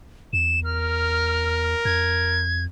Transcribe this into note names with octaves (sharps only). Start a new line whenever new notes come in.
E2 E7
A#4 F6
F2 G#6